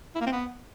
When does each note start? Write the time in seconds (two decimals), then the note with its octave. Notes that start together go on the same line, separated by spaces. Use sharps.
0.15 E4
0.21 A#3
0.26 C4
0.32 B3